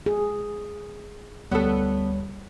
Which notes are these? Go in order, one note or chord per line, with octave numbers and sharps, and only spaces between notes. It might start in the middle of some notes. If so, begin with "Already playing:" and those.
G#4
D2 G3 B3 A4 C#5